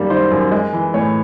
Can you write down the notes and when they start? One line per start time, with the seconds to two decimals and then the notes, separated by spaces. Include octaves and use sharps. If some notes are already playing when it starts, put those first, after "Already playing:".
Already playing: F#2 D#3 G3 A#3
0.10 D#3 C5
0.31 F#2
0.52 G#3
0.73 E3
0.94 A2 C#5